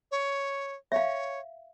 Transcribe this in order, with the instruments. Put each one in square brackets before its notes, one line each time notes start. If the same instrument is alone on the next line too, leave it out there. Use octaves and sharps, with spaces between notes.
[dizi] C#5
[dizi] C#5 [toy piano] E5 F5